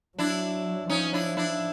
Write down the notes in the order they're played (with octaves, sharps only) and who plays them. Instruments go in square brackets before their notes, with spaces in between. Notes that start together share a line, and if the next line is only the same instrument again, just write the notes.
[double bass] F#3 [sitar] D4 E4
[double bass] F3 [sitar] C#4 D#4
[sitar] D4 E4
D4 E4